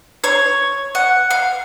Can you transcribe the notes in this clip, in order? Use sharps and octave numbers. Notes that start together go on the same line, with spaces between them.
C#5
F#5
F5